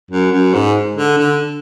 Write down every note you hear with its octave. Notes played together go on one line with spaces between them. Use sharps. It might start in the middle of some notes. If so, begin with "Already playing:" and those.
F#2
F#2
G#2
D3
D3